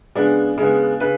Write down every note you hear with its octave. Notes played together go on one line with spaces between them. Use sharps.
C#3 G#3 B3 D4
C#3 G#3 B3
C#3 B4